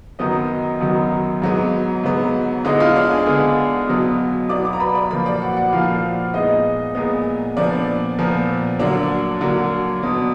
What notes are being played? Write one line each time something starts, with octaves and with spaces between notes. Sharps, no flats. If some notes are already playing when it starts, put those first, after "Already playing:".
F#2 D#3 F#3 B3 D#4 D#5
F#2 D#3 F#3 B3
G#2 F#3 B3
G#2 F#3 B3
D3 G#3 B3 D#4 D#5
F4 F5
D4 D5
G#4 G#5
D3 G#3 B3
B2 F#3 B3
B2 F#3 B3 D5 D6
D5 D6
A#5
B4 B5
D5 D6
A#2 F3 A#3 B4 B5
D5 D6
F#4 F#5
F#4 F#5
A#2 F3 A#3 F4 F5
A#2 G#3 B3 D#4 D#5
A#2 G#3 B3
A#2 F3 B3 D4 D5
A#2 F3 B3
D3 F#3 A#3 D4 D5
D3 F#3 A#3
B2 F#3 B3